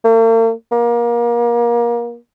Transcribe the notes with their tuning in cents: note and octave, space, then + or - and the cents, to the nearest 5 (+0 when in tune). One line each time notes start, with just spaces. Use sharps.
A#3 -45
A#3 +30